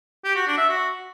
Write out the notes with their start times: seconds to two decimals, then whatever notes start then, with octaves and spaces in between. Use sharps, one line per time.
0.24 G4
0.36 F#4
0.47 D4
0.58 E5
0.69 F#4